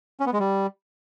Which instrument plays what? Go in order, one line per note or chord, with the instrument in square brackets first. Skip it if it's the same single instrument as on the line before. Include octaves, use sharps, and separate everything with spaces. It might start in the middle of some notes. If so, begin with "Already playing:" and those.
[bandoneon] C#4
B3
G#3
G3